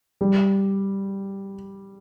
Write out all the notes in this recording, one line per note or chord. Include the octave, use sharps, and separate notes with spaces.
G3